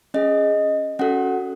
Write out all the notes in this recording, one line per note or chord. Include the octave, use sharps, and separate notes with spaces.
C#4 G#4 D#5
C#4 F#4 A4 F#5